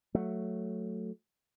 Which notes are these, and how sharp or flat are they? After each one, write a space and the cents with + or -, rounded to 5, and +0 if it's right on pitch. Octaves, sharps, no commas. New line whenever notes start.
F#3 -5 A3 +0